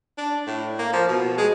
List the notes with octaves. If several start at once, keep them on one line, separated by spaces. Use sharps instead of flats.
D4
A2
A#3
F3
B2
G#3